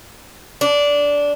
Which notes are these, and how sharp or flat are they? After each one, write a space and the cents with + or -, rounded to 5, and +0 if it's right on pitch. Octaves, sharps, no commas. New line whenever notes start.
D4 -15